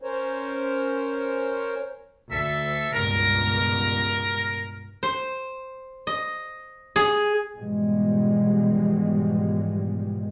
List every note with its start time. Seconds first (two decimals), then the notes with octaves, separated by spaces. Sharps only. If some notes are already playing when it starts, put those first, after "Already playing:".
0.02 C#4 A#4 C5 C#5
2.31 D2 A4 E5
2.92 C#2 G2 B2 A#4
5.03 C5
6.07 D#5
6.96 G#4
7.56 G#2 B2 E3 F3 G3 G#3